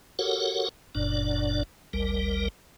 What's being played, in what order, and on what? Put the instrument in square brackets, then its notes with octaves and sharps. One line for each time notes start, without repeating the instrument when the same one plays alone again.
[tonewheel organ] F#4 G4 A4 A#4 C#5 F#5
F#1 F#2 A#2 D4 D5
G#1 D2 G3 A#4